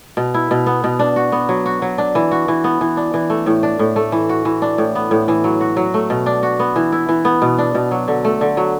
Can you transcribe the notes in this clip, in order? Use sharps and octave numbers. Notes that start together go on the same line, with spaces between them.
B2
E4
B2
B3
B2
D4
F#4
B3
F#3
F#4
F#3
D4
E3
F#4
E3
B3
E3
D4
E3
A3
A2
D4
A2
A3
E3
F#4
E3
D4
A2
B3
A2
E3
F#3
F#4
F#3
A3
B2
D4
F#4
B3
E3
E4
E3
B3
B2
D4
B2
F#3
D3
A3
D3
F#3